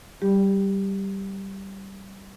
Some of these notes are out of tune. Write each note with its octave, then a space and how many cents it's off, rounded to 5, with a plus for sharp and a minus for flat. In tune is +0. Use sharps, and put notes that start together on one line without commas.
G3 -10 G4 +10